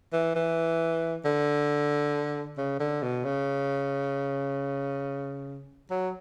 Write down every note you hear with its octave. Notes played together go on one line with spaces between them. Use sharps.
E3
E3
D3
C#3
D3
B2
C#3
F#3